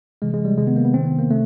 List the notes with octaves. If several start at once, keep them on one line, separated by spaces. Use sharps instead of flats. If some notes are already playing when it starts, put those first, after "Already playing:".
C3 E3 G#3
G#3
G3
C3 D#3 G#3
B3
A#3
B3
C3 D#3 C4
B3
A#3
C3 A3